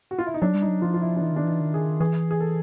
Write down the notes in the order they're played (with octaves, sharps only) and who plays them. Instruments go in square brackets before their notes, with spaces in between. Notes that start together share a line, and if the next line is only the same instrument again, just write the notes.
[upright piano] F#4
F4
E4
D#4
[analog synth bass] F#3 [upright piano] D4
[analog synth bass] G3
[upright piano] D#4
[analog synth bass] F#3
[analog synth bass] F3 [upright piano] F4
[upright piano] F4
E4
D4
[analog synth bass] E3 [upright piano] D#4
[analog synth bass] D#3 [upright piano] D4
[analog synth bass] E3 [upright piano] D#4
[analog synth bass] D#3
[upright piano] G#4
[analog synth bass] E3 [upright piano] G#4
[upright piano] G#4
A4